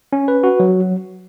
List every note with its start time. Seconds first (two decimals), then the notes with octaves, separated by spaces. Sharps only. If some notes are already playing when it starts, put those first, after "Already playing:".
0.13 C#4
0.28 B4
0.44 F#4
0.60 F#3